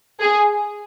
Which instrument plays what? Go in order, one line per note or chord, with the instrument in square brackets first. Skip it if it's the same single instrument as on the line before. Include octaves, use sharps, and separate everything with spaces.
[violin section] G#4